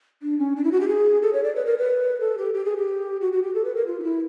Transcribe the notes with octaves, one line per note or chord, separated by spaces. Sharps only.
D4
C#4
D4
E4
F#4
G4
G#4
A4
C#5
D5
B4
A#4
B4
A4
G4
G4
G#4
G4
F#4
F#4
G4
A4
B4
A#4
F4
D#4
E4